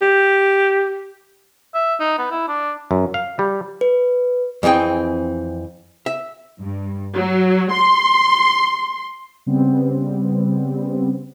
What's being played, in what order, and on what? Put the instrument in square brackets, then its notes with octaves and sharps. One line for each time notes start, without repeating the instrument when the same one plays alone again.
[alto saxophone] G4
[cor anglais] E5
D#4
B3
E4
D4
[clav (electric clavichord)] F#2
F5
G3
[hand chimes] B4
[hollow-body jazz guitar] F2 E3 C4 G#4 G5
E5
[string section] G2
F#3
C6
[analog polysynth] C#3 G3 B3 C4